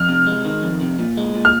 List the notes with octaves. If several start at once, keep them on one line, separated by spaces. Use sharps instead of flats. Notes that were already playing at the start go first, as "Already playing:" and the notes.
Already playing: F2 F6
C3
G#3
D#3
F2
C3
A#2
G#3
A#2
F6